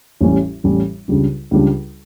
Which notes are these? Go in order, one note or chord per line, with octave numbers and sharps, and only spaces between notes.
A1 A2 G3 C#4
A1 A2 G3 C#4
C#2 C#3 G3 D4
C#2 C#3 G3 D4